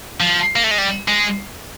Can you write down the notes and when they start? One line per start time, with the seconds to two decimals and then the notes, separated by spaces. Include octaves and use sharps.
0.20 F3
0.56 A#3
0.64 A3
0.71 G#3
0.78 G3
1.08 G#3